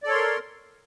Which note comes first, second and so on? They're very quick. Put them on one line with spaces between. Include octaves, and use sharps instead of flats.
D5 A4 C#5 C6 A#4